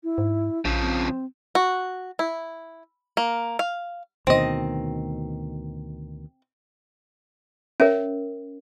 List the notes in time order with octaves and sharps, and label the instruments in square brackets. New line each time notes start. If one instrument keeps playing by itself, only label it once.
[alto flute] E4
[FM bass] G#2
[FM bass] A#1 [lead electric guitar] C#3 F3
[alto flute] C4
[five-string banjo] F#4
E4
A#3
F5
[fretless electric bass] D2 B2 D#3 [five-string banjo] C4 D#5
[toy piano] C#4 A#4 [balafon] C#5 E5